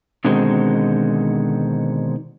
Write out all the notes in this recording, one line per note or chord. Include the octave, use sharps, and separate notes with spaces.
B2 D3 D#3 G#3 C4 F#4